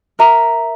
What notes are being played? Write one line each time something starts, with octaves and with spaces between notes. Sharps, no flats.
A#4 E5 A#5